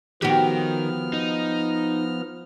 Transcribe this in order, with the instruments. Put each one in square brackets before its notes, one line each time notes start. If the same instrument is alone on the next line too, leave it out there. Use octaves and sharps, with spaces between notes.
[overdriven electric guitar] D#3 [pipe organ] F3 B3 F6 [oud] F#4 G4
[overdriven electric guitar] D#4